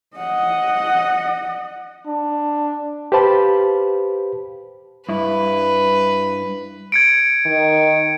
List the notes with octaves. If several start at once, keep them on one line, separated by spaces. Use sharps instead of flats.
D#5 F#5
D4
G4 B4 C5 F5 A5 B5
G2 E4 B4
G#6 C#7 D7
D#3